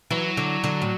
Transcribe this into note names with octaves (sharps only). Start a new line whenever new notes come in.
E3 F#3
D3
D3
A2